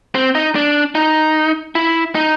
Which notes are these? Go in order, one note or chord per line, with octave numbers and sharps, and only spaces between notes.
C4
D#4
D4
D#4
E4
D#4